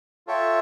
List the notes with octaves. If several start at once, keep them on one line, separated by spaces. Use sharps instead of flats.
F4 A4 C#5 E5 G5